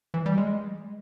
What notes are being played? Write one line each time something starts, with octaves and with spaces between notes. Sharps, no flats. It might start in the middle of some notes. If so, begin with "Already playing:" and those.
E3
G3
G#3